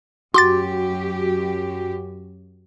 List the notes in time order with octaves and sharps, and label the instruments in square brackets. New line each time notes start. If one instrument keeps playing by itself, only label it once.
[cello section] F#2 G4 [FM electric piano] F#4 [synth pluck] C6 D6 A6